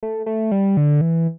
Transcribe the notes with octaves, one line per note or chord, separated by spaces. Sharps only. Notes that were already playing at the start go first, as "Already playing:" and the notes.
A3
A3
G3
D3
E3